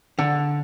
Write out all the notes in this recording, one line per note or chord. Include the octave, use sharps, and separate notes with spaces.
D3